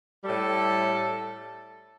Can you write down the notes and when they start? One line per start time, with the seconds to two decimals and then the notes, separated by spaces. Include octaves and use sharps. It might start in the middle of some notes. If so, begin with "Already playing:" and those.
0.25 A2 G3 A4